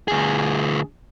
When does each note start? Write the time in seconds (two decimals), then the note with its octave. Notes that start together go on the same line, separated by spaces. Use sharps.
0.08 D2 G#4